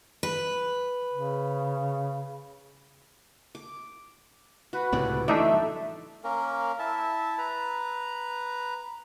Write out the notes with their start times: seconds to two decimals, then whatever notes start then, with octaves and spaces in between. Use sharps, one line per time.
0.23 B4
1.13 C#3
3.55 D6
4.73 F#4 B4
4.92 C#2 A2 C3 D5
5.28 E3 A3 D4 D#4 D5 E5
6.24 A#3 C#4 A#4
6.79 E4 E5 A5
7.38 B4 A#5